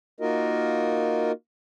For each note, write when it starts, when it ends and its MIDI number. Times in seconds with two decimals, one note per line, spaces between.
0.20 1.32 58
0.20 1.32 63
0.20 1.32 65
0.20 1.32 66
0.20 1.32 70
0.20 1.32 75